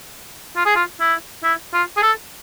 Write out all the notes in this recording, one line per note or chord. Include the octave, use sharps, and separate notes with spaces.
F4
G#4
F4
E4
E4
F4
G#4
A4